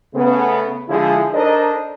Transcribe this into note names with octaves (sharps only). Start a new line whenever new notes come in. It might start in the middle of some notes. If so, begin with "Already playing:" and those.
C#3 A3 B3
D3 F3 G#3 E4 G#4
D4 D#4 A4 A#4 C5 D#5